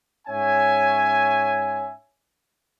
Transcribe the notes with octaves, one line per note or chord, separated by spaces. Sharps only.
G#2 C#4 C#5 E5 G#5